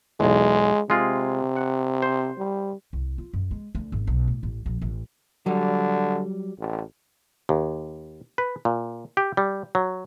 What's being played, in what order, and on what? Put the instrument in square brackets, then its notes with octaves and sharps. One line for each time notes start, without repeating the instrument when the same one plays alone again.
[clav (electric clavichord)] B1 E2 [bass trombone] G#3
[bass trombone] C3 [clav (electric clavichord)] G#3 F4 G#4
[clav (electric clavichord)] F#5
C5
[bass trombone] G3
[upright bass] C2
F4
F#2
G#3
D2
G#1
B1
A2
A1
A#1
A1
[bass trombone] D3 [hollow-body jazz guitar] F#3 G3
[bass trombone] A1
[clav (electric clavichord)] D#2
B4
A#2
G4
G3
F#3